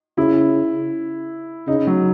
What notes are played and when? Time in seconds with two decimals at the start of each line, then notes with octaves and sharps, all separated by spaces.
0.18 C#3 E4
1.67 C#3 D#4
1.87 F#3